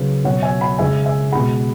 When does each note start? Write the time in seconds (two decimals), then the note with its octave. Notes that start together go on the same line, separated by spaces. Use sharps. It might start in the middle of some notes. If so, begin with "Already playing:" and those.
Already playing: C#3 F#3 B4
0.24 B2 F#3 C#5 F#5
0.42 E5 G#5
0.61 F#5 B5
0.78 C#3 G#3 E5 G#5
1.05 E5 G#5
1.32 B2 G#3 F#5 B5